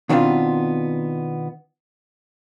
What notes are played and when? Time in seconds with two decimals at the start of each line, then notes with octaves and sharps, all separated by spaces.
0.09 B2 D#3 B3 C4 D4 F4